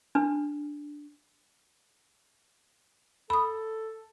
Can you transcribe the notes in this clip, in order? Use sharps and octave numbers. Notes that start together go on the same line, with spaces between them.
D4
A4 B5 D#6